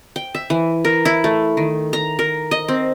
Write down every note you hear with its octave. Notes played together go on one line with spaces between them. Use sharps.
G5
E5
E3
A#4
E4
A3
D#3
A#5
A#4
D#5
C4